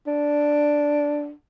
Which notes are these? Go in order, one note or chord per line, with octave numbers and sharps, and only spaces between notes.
D4